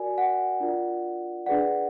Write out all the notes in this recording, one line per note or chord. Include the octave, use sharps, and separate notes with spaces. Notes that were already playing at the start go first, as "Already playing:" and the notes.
Already playing: F#4 A#4 D5 G#5
F#5
D4 F4 A#4 D5
D4 G#4 B4 D5 F#5